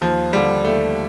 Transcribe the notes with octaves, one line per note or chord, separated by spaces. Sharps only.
D#2 F3
D3 F3 G3
D#2 A3